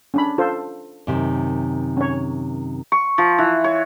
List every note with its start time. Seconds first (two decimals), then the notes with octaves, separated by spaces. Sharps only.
0.14 C#4 D4 B5
0.38 F4 A4 C5
1.07 F#2 C3 D#3
1.97 C#4 C#5
2.92 C#6
3.18 F3
3.38 E3
3.64 C#5